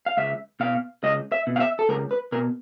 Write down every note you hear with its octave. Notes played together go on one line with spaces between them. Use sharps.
F5
C#2 E5
B2 F5
C#2 D#5
E5
B2
F5
E5
A4
C#2 A#4
B4
B2 A#4